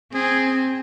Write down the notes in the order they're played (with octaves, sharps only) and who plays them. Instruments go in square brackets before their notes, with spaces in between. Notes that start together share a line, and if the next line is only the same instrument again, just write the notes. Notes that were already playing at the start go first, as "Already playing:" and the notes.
[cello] C4 [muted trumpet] G#4